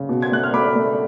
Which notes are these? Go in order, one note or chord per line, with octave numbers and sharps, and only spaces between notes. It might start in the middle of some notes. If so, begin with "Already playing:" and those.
Already playing: C#3
B2
G#6
A3 F#6
F6
A3 B5 D6
A3